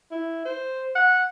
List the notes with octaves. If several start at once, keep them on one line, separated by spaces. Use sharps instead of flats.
E4
C5
F#5